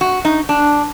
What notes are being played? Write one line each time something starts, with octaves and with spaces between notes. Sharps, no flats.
F#4
D#4
D4